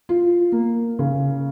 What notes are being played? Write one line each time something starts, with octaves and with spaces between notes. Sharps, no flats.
F4
A#3
C#3